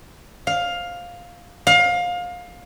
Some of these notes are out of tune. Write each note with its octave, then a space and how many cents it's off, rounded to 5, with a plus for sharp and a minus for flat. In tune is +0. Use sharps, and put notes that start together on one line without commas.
F5 +10
F5 +25